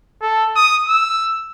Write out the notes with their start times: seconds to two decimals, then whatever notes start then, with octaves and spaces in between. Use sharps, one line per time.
0.21 A4
0.56 D#6
0.88 E6